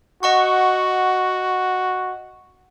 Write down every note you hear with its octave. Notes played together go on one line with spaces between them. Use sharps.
F#4 D#5 F#5 C#6